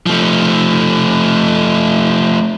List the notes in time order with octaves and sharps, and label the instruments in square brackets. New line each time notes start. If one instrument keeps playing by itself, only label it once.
[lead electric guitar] F3 A3